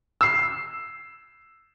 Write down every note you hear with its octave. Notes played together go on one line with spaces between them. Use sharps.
E6 C7